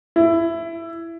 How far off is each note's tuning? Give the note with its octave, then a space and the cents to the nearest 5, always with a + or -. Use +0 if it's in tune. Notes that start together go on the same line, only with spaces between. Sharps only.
E4 +15